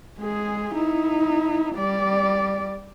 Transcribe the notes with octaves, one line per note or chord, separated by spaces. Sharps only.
G#3 G#4
D#4 E4
G3 D5